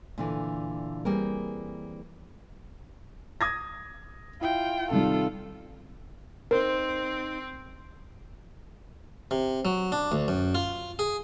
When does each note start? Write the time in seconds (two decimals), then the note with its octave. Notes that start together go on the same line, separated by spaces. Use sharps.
0.18 A#2 D3 E3
1.05 E3 G3 A#3 C4 G#4 A#4
3.41 D#6 G#6 A#6
4.41 E4 F4 G5
4.91 C3 D#3 G3 F4 A4
6.51 C4 D#4 A#4 C5
9.31 C3
9.65 F#3
9.92 D4
10.12 D2
10.28 F#2
10.55 F4
10.99 G#4